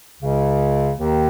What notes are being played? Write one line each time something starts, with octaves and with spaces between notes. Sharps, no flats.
C#2 C#3
D#2 D#3